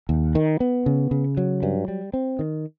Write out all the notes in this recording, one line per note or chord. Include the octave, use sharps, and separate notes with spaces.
D#2
D#3
B3
C#3
C#3
F#3
G2
G3
C4
D#3